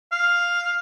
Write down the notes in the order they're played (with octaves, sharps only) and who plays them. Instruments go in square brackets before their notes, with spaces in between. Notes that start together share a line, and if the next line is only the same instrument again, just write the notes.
[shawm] F5